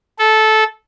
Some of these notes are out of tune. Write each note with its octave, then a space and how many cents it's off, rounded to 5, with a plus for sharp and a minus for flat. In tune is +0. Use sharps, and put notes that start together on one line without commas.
A4 -15